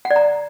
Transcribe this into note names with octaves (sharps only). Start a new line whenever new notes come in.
F#5
D5
A#5